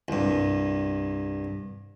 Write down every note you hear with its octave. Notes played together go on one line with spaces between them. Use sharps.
C2 G2